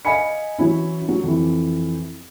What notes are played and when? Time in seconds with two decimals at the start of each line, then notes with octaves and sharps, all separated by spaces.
0.05 D#5 F5 G#5 B5 C#7
0.59 E3 F#3 C#4 E4
1.09 F#3
1.23 F2 E3